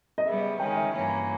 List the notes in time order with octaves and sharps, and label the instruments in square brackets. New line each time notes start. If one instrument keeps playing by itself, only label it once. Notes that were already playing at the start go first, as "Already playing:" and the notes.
[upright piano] D#5
[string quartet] C#3 G3 B3 [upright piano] E5
[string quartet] D#3 G#3 C#4 [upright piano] G5
[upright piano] E5
[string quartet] G2 E3 A#3 C#4